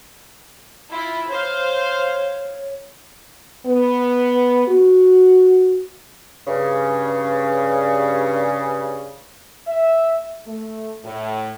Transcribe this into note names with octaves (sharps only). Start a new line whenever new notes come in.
E4 F4 B5
C5 C#5 F5
B3
F#4
G2 C#3
E5
A3
A2